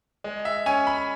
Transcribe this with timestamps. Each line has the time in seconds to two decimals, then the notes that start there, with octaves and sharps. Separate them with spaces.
0.24 G#3
0.45 E5
0.66 C#4 G#5
0.87 B5